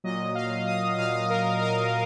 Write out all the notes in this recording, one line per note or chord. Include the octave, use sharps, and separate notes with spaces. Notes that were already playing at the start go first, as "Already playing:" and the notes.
A#2 F#3 D#5
F5
D#6
A#2 F#3 F5
A#4
A#4